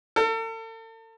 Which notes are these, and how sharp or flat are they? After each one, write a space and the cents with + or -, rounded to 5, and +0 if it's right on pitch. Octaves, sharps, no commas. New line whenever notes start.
A4 +40